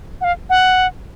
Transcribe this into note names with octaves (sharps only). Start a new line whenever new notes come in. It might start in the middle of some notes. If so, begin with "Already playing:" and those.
F#5
F5
F#5